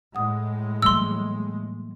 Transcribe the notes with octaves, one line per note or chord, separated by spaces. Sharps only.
A2 G#3 F#5 D#6
E3 F#3 G3 A3 A#3 C6 E6